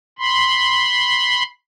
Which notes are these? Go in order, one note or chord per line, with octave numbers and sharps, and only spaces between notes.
B5 C6